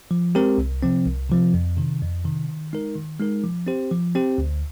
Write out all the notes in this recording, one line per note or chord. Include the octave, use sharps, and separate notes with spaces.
F3
G#3 C4 G4 A#4
C2
C3 F3 C4
C2
C3 F3 C4
F2
C3 D#3
F2
C3 D#3
D#3
G#3 D#4 A#4
D#3
G#3 D#4 A#4
F3
C4 G4 C5
F3
C4 G4 C5
D2